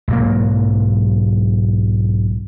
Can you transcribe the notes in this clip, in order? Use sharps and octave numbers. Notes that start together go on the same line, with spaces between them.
B1 G#2 F#3 A#3